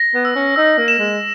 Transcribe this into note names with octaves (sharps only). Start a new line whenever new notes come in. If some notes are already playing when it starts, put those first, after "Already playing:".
Already playing: A#6
B3
E6
C#4
D#4 E6
A#3
E7
G#3